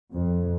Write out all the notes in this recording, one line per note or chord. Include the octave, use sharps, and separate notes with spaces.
F2